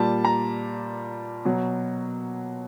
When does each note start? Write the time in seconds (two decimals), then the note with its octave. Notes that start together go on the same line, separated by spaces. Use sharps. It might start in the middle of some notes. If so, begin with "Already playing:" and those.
Already playing: A#2 G3 A5
0.25 A#5
1.45 B2 F#3